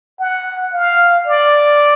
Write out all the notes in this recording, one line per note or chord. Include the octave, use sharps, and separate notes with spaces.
F#5
F5
D5